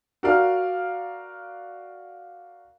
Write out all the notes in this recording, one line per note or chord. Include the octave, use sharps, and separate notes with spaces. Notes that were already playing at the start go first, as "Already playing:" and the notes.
F#4 A#4 D5 F5